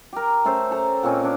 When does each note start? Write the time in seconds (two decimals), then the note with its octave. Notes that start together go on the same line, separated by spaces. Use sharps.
0.13 G4 A#4
0.45 A3 C#4 A4 C5
0.71 A4 A#5
1.03 A#2 C4 C#4 D#5
1.23 C#4 D4